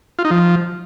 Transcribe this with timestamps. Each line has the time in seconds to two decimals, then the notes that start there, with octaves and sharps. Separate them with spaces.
0.19 F4
0.25 D#4
0.31 F3